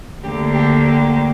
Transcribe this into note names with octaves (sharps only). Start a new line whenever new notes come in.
D2 D3 A#3 G4
G4
G4